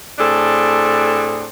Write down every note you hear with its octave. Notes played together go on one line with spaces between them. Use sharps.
A2 C4 D4 G#4 A4